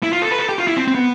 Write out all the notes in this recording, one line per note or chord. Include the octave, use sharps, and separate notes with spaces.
E4
F4
A4
B4
A4
G4
F4
E4
C4
C4
B3